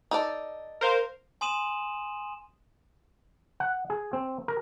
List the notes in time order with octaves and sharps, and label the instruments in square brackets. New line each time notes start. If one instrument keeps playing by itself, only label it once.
[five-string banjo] D#4 A4 D5
[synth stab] A#4 C5 F5
[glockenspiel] G#5 C6 D#6 D#7 E7 F#7
[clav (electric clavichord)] F#5
G#4
C4
A#4